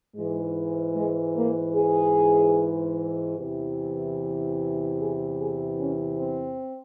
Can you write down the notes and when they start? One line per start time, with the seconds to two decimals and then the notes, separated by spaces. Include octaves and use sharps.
0.15 G#2 E3 G#3
0.95 G#3
1.37 A#3
1.76 G#4
3.37 E2 C3 E3
4.98 G#4
5.39 G#4
5.79 C#4
6.19 C4